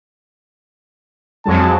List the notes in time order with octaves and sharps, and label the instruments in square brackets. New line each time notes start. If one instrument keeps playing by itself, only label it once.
[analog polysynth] F2 F#3 G#3 [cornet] A5